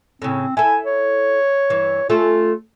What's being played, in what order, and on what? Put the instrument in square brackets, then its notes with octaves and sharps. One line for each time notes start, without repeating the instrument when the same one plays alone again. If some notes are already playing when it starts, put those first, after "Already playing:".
[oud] A2 C#3 [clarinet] C4
[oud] E4 A4 [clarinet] G#5
[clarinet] C#5
[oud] G2 E3
[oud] A3 C#4 A4 [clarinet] F4